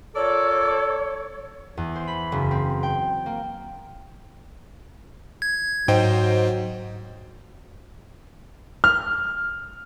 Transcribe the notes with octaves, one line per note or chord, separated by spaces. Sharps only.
F4 A4 A#4 C#5 D5
E2
C5
B5
F#1
C4
G5
A#3
G#6
G#2 F#3 C5 D#5 G5
F6